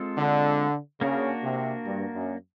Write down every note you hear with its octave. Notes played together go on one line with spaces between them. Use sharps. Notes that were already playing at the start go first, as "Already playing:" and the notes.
Already playing: G#3 C4 F4 A4
D3
C#3 A#3 D4 F#4 A#4
C3
G2
F#2